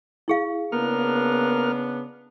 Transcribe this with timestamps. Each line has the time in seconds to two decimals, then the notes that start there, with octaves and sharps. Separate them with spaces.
0.28 E4 G#4 F5
0.72 C#3 A#3 B3 D4 A#4 F6